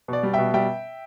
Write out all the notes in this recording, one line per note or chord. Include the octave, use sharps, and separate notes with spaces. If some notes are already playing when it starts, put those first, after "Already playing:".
B2 D5
G3
B2 E5 G5
G3 E5 G5